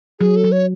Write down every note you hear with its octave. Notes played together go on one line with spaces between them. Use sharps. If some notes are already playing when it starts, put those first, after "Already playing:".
F#3 G#4
A4
F#3
C#5